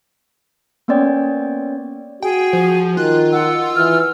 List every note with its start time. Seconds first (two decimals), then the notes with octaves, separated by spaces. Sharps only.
0.88 A#3 B3 C#4 C#5 D5 G5
2.23 F#4 G#4 G5
2.53 F3
2.97 D#3 F4 F#6
3.33 F#5 E6
3.76 E3 F6